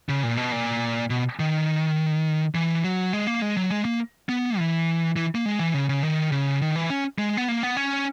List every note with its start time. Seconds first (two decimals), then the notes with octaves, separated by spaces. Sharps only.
0.09 C#3
0.23 A#2
0.37 B2
0.52 A#2
1.10 B2
1.39 D#3
2.55 E3
2.84 F#3
3.13 G#3
3.27 A#3
3.42 G#3
3.57 F#3
3.70 G#3
3.85 A#3
4.29 B3
4.58 E3
5.16 E3
5.35 A#3
5.46 G#3
5.59 E3
5.74 C#3
5.89 C#3
6.03 D#3
6.32 C#3
6.62 D#3
6.76 E3
6.90 C#4
7.18 G#3
7.37 B3
7.48 A#3
7.63 B3
7.77 C#4